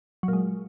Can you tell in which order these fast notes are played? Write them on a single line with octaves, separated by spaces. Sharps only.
F#3 A#2 G#3